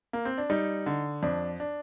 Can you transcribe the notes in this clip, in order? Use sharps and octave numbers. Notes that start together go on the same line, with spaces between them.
A#3
C4
D4
G3 D#4
D3
F2 D4
D4